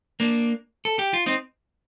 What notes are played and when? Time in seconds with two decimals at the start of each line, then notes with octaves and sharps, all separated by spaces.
0.20 A#3 D4
0.85 A4
0.99 G4
1.13 F4
1.26 C4 D#4